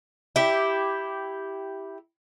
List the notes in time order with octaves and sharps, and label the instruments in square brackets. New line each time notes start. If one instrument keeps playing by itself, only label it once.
[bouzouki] E4 G4